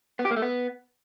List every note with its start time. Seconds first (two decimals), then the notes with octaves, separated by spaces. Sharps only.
0.19 B3
0.25 G4
0.31 A#3
0.36 A3
0.42 B3